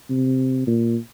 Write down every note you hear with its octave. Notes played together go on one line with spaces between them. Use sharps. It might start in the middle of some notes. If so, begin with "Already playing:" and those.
C3
A#2